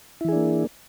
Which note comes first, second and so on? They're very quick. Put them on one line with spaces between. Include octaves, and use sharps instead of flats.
E4 E3 G#4 D4 A#3